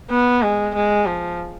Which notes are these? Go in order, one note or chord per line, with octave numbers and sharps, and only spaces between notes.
B3
G#3
G#3
F3